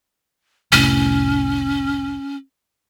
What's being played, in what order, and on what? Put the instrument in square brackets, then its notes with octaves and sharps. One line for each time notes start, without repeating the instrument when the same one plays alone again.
[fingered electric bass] F1 C2 A2 [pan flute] C#4